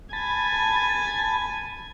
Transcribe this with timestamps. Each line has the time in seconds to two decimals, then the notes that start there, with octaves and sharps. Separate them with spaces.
0.13 G#5 A5 B5 A6